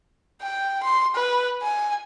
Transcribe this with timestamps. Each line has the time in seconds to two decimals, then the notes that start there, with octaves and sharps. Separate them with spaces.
0.42 G5
0.82 C6
1.14 B4
1.62 G#5